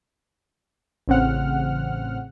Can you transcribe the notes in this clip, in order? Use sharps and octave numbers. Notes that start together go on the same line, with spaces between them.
A1 C#3 C4 F#5 F6